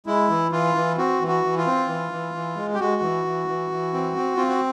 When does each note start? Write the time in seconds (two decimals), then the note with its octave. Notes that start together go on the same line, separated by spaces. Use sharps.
0.06 G#3 E4
0.29 E3
0.52 E3 F4
0.75 E3
0.98 C4 F#4
1.21 E3
1.28 F#4
1.44 E3
1.58 F4
1.66 C4
1.88 E3
2.11 E3
2.34 E3
2.56 G#3
2.75 G4
2.80 G#3 F#4
3.01 E3
3.25 E3
3.48 E3
3.71 E3
3.93 C4
4.16 C4
4.36 C4 F4
4.48 F#4